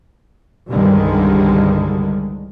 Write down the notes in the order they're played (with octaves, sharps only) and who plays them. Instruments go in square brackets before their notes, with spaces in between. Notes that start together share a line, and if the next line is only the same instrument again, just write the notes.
[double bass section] C2 G2 D3 D#3 G3 G#3